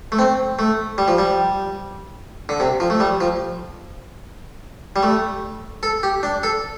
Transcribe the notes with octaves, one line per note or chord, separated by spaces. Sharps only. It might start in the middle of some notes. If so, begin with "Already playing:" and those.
A3
C4
A3
G3
F3
G3
D3
C3
F3
A3
G3
F3
G3
A3
A4
G4
D4
A4